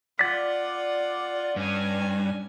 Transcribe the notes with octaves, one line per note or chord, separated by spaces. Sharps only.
F4 D5 F#5 A6 B6
G2 C#4 G#5